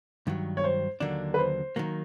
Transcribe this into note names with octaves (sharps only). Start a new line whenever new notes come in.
G2 D#3 F#3
C#5
C5
D#2 D3 F#3 A#3 D4
B4
C5
D#3 F#3 A#3